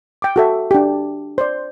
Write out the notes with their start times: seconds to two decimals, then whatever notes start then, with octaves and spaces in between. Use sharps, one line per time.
0.22 G5 D6
0.36 F#4 A4 E5
0.71 D4 G4
1.38 C5 D5